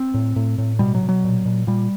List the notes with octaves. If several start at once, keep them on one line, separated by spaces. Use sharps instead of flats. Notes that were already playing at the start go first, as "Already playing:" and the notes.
Already playing: C4
A2
A2
A2
B2 G3
F#3
B2
F#3
A#2
A#2
A#2 G3